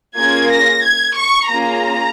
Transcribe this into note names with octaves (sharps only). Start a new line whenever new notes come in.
A#3 C#4 F4 G#4 G#6
A#6
G#6
C#6
A#3 C#4 F4 G#4 A#5